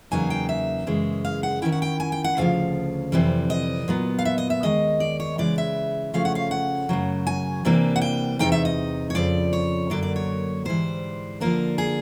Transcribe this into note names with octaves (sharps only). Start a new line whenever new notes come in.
E2 C#3 F#3 A#3 D#4 G#5
G5
E5
F#2 C#3 E3 G#3
F5
F#5
D#3 G#3 C#4 E4 G5
F#5
G5
G#5
G5
F#5
D2 C#3 F3 F5
F2 C3 E3 G3
D#5
A#2 F#3 B3
F5
E5
D#5
E5
D#2 D#3 G#3 D#5
D5
C#5
C#3 E3 G#3 D5
E5
C#3 F3 A3 C#4 F5
F#5
F5
F#5
F#2 C#3 F#3
G#5
C3 E3 G3 A#3 D4
F#5
G5
E2 C3 F3 A#3 D#4 G5
E5
D#5
C#5
F2 C#3 F3 D5
C#5
F#2 D3 F#3 A#3 D5
D5
C#5
G#2 E3 G3 C5
D3 F3 A#3 D4 A#4
G#4